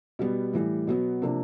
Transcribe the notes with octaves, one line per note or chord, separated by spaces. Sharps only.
B2 G3 B3
A2 E3 G3
B2 F#3 B3
C3 F3 A#3 D4